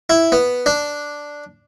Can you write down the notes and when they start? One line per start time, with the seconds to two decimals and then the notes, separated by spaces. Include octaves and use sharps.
0.10 E4
0.32 B3
0.66 D4